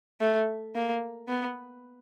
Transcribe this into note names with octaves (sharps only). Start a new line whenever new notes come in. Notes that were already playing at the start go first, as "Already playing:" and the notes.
A3
A#3
B3